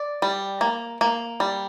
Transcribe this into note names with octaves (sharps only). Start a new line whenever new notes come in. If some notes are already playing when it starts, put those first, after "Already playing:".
Already playing: D5
G3
A#3
A#3
G3